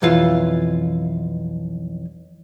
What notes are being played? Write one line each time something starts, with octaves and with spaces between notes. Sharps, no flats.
B1 F2 E3 F4 F5